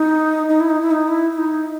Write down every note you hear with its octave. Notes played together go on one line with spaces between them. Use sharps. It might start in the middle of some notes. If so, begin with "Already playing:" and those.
Already playing: D#4
D#4
E4
D#4
E4
D#4
E4
E4
D#4